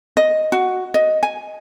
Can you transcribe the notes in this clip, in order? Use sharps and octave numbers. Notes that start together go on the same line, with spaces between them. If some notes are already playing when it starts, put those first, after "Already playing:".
D#5
F#4
D#5
G#5